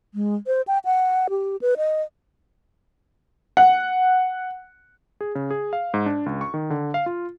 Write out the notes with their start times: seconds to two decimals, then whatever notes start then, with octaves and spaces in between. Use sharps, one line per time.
0.14 G#3
0.47 C5
0.68 G5
0.85 F#5
1.30 G4
1.61 B4
1.77 D#5
3.57 F#5
5.21 G#4
5.35 C#3
5.50 G#4
5.73 F5
5.94 G#2
6.06 D4
6.26 C#2
6.41 C#6
6.54 D#3
6.70 D3
6.94 F5
7.06 F4